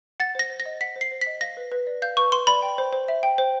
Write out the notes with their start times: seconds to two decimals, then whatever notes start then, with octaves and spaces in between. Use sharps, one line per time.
0.20 F#5 A6
0.35 C5 A#6
0.50 C5
0.60 A#6
0.66 D#5
0.81 F#5 B6
0.96 C5
1.01 C7
1.11 C5
1.21 B6
1.27 D#5
1.41 F5 A#6
1.57 B4
1.72 B4
1.87 D5
2.02 F5 G6
2.17 B4 C#6
2.32 B4 C6
2.47 D5 B5
2.62 G5
2.78 C5
2.93 C5
3.08 E5
3.23 G5
3.38 C5